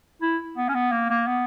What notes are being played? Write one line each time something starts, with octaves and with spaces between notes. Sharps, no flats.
E4
B3
C#4
B3
A#3
A#3
B3